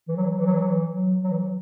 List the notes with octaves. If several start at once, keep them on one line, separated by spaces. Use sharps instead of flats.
E3
F#3
E3
F#3
E3
F#3
E3
F#3
E3
F#3
F#3
E3
F#3